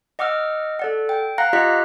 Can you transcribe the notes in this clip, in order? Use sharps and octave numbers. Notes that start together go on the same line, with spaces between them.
D#5 F#5 D6 E6 F6
A4 D5 F#5
G5
F5 F#5 A#5 F#6 A#6
F4 G4 D#5 F#5 F#6 B6